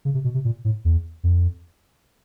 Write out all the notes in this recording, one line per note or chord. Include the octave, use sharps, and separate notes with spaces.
C#3
C3
B2
C3
A#2
A2
E2
F2